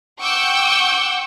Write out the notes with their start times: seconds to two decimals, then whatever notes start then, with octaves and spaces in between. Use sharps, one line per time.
0.20 F#5 G5 C#6 D6 E6 G6